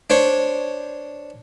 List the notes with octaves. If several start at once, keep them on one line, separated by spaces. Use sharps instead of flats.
D4 C5 C#5